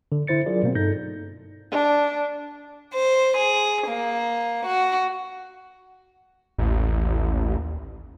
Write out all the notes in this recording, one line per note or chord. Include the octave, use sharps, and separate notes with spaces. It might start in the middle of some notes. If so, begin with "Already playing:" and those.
D3
D3 E4 C5 A6 C#7
F#3 D4 F4 G#4 A#4 D5
B2 A#3 C4
G2 D#4 A4 G6 A#6
D4
C5
G#4
A#3
F#4
A1 D#2